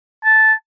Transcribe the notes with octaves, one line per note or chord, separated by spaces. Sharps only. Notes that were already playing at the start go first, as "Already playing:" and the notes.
A5